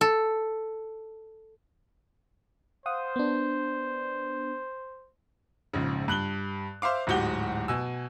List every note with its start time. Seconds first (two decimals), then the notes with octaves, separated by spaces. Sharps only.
0.01 A4
2.86 C5 F5 F#5 D#6
3.16 B3 D4
5.73 A#1 G#2 C#3
6.08 G2 F#6 F#7 G7
6.82 C5 E5 F5 D6
7.07 D1 G#2 F#4 G4 G7
7.68 B2 G#5 E6